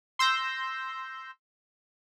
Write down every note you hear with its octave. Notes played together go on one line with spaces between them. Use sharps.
C6 E6 G6 A#6